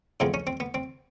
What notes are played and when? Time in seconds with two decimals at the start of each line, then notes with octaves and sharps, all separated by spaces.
0.20 A2 F3 G#3 B3 C4
0.34 C#4
0.47 C4
0.60 B3
0.74 C4